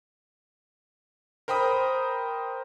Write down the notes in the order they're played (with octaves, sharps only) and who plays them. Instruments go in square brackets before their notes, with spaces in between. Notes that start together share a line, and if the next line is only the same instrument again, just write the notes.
[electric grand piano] A#4 C5 G5 B5 D#6